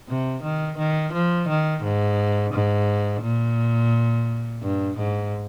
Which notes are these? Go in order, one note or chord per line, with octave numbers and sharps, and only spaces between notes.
C3
D#3
D#3
F3
D#3
G#2
G#2
A#2
G2
G#2